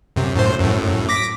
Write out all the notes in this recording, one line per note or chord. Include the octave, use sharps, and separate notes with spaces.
F#2 C3
F#2 A2 C5
F#2 A2
D6 A#6 B6